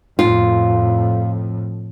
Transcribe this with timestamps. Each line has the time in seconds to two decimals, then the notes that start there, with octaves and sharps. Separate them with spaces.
0.19 F2 A2 F4